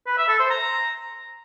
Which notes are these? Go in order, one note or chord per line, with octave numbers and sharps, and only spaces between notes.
B4
E5
A4
C5
A#5